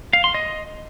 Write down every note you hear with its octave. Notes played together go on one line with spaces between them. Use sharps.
F5
C6
D#5